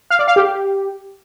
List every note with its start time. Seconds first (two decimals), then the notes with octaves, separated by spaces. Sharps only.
0.10 F5
0.19 D5
0.28 F5
0.36 G4